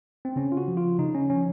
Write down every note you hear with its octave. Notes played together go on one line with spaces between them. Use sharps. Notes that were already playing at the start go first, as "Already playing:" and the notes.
C4
C#3 C#4
F4
F#4
F3
F4
C#3 D#4
C#4
F3 C#4